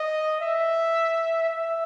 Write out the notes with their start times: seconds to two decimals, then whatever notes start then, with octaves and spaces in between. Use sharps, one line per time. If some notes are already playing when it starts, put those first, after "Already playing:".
Already playing: D#5
0.41 E5
1.49 E5